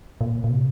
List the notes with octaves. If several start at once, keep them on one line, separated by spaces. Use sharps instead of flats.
A#2
A#2
C3